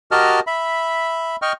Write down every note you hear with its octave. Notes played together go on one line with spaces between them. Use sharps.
F#4 G4 A#4 D#5 A5 F6
E5 B5
D#5 G5 C#6 F6